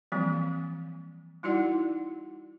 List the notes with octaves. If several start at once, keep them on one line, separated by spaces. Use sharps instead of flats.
E3 F3 G3 A#3 C4
G3 D#4 E4 F#4 D5 F#5